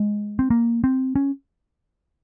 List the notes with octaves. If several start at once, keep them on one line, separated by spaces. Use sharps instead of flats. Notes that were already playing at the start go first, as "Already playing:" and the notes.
Already playing: G#3
C4
A#3
C4
C#4